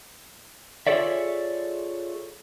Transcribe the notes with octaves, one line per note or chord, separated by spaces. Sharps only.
F4 G#4 A4 C#5 D5 E5